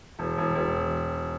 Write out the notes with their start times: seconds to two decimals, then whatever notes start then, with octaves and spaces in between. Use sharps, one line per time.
0.19 E1
0.38 E1
0.55 E1